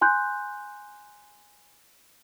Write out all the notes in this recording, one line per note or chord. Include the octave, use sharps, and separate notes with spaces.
G#5 C6 F#6 G6